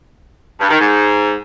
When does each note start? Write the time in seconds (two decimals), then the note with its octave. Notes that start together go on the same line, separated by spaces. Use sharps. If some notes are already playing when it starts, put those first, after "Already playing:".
0.59 G2
0.70 D#3
0.80 G#2